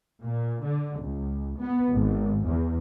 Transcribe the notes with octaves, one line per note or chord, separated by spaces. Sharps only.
A#2
D3
C#2
B3
G#1
E2